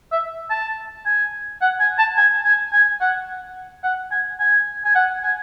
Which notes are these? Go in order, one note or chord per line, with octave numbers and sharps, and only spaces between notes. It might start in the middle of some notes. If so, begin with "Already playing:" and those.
E5
A5
G#5
F#5
G#5
A5
G#5
G#5
G#5
F#5
F#5
G#5
G#5
G#5
F#5
G#5